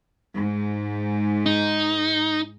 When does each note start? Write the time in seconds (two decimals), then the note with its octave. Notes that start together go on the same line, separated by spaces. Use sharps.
0.36 G#2
1.46 D#4